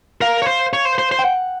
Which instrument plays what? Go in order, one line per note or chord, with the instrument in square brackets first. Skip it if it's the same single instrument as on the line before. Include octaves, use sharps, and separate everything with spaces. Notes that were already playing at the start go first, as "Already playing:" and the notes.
[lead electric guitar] A#4 [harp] F5
[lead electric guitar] C#5
C5
C#5
C5
C5
C5
[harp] G5
F#5